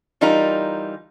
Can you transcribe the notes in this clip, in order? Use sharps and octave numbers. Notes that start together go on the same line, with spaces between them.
E3 G3 D#4 F4 A#4 A#5